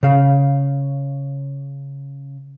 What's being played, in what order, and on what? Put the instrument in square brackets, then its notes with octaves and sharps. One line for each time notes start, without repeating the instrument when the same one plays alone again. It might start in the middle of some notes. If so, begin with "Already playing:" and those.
[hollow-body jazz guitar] C#3 F5